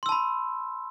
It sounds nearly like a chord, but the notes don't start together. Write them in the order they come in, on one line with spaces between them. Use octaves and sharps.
C6 E6 A5 B5